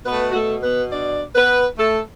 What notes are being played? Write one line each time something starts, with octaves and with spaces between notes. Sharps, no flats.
B2 A3 B3 B4
F#4
A3 A4
B3 B4
D4 D5
B3 B4
A3 A4